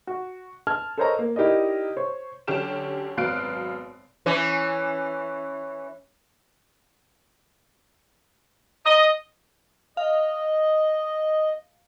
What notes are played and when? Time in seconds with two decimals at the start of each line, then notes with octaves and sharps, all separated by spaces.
0.07 F#4
0.67 A5 F6 G#6
0.98 A4 A#4 C5 C#5 D#5 A#5
1.19 A#3
1.36 D#4 E4 G4 A#4 D5 D#5
1.97 C5 C#5
2.47 D3 F#3 C#4 G4 F6 E7
3.17 G#1 F#2 B2 F5 F#6 D7
4.26 E3 C#4
8.86 D#5
9.97 D#5 F5